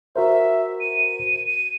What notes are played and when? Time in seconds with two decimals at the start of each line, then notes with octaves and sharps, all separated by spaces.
0.16 F#4 A#4 C5 E5
0.81 D#7
1.47 D#7